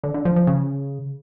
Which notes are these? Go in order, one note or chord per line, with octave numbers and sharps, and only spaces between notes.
D3
D3
F3
F3
C#3